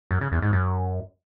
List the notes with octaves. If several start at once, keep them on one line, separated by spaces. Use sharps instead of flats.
F#2
C#3
E2
G#2
F#2